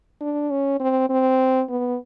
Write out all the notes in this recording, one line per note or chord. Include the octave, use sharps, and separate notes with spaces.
D4
C#4
C4
C4
B3